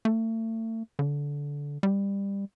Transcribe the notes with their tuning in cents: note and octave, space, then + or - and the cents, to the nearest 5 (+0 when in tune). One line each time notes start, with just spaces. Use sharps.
A3 +35
D3 -20
G3 +20